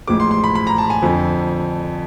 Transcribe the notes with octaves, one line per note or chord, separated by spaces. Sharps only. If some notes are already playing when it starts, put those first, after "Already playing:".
A1 A2 F3 G#3 D6
C6
C6
B5
B5
A#5
A5
G#5
F2 D3 F3